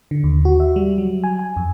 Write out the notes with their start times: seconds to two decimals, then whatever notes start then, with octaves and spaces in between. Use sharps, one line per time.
0.11 D3
0.24 D#2
0.45 F#4
0.60 E5
0.76 G3
0.98 F#3
1.24 G#5
1.39 G#5
1.57 F2